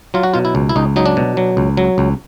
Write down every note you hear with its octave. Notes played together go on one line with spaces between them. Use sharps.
F#3 F4
F#4
B2 F4
E4
C#2
E4
C#2 D#4
F#3 D#4
D4
B2
F#3
C#2
F#3
C#2